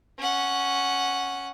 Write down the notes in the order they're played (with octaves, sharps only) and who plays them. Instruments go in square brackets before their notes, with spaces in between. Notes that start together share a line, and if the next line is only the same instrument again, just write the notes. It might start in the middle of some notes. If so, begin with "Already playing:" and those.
[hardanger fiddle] C#4 F#5